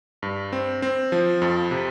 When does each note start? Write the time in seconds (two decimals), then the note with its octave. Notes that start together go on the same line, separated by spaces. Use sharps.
0.23 G2
0.53 C4
0.82 C4
1.12 F3
1.42 F2
1.71 C3